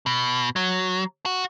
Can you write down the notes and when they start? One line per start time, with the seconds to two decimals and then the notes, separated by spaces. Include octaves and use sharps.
0.06 B2
0.56 F#3
1.26 F#4